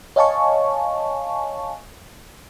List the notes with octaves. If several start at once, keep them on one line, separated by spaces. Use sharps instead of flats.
C#5 D#5 F5 G#5 A5 C#6